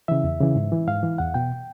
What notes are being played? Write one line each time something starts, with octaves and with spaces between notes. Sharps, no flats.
C#3 E3 E5
E2
C#3 E3
G#2
E3
G#2 F5
E3
E2 F#5
B2 G5